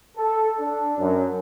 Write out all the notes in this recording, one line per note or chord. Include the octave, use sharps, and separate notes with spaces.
A4
D4
F#2